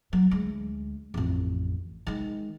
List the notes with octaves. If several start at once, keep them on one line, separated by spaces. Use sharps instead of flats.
F#3
D2 G#3
A1 F2
D#3 G#3